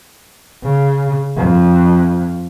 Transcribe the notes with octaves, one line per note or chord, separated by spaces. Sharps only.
C#3
F2